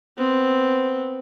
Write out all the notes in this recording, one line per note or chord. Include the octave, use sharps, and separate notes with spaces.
B3 C4